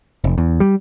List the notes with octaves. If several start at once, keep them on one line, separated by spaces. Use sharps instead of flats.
F1
E2
G3